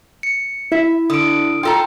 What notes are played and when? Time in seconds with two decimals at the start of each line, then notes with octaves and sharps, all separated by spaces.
0.23 C#7
0.72 E4 E5
1.10 D3 D#6 D7
1.63 F4 A4 G5 A#5